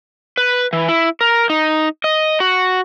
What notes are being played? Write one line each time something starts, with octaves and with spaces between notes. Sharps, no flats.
B4
E3
E4
A#4
D#4
D#5
F#4